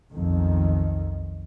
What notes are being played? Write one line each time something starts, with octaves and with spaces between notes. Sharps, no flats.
B1 F2 D#3